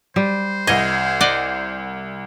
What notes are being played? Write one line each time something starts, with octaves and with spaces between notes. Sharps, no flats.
G3 C5
C2 D#5 G#6
D5 D#5 F#5